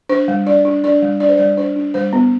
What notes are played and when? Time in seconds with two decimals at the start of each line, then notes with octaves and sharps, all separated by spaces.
0.09 D4 C5
0.28 G3
0.47 D4 D5
0.65 D4
0.84 D4 D5
1.02 G3
1.20 D4 D5
1.29 C5
1.37 G3 D5
1.57 D4 C5
1.76 D4
1.94 G3 C5
2.13 B3